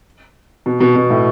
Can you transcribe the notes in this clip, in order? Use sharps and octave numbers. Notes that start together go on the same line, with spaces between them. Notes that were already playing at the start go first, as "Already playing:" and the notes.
B2
B2
B2
A2